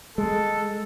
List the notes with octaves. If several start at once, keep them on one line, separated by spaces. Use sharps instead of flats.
G#3 A4